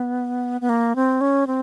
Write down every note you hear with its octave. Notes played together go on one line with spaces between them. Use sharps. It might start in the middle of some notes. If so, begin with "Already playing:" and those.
Already playing: B3
B3
A#3
C4
C#4
C4